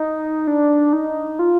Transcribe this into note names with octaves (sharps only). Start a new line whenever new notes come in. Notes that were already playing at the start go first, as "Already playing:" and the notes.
Already playing: D#4
D4
D#4
F4